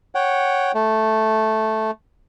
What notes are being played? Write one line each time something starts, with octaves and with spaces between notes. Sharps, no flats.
C#5 F#5 G5
A3